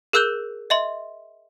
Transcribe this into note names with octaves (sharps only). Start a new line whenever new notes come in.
G#4 A#4 E6 F#6 G6 G7
D#5 E5 C6